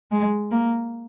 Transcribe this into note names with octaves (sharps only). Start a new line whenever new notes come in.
G#3
A#3